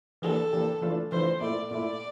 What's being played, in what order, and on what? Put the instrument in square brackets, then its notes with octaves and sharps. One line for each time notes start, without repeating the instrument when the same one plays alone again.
[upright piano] E3 A#3 D4 G4 [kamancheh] A4
[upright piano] E3 A#3 D4 G4
E3 A3 D4 F4
[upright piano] E3 A3 D4 F4 [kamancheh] C5
[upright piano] A#2 A3 E4 [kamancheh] D5
[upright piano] A#2 A3 E4 [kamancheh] D5